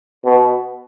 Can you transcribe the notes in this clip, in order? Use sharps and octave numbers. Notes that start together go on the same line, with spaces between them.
B2